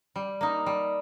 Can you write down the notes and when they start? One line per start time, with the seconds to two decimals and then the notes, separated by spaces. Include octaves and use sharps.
0.16 G3
0.41 A#3 D#4
0.66 G3